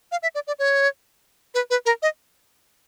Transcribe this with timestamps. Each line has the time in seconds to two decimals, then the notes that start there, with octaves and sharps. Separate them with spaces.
0.12 F5
0.23 E5
0.35 D5
0.47 D5
0.59 C#5
1.54 B4
1.70 B4
1.86 A#4
2.02 D#5